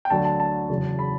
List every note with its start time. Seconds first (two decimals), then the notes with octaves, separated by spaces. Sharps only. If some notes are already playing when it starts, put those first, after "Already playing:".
0.05 G5
0.10 D2 D3 F#3 A5
0.25 A5
0.40 A5
0.70 F#1 E2 C#3 F#3
0.99 B5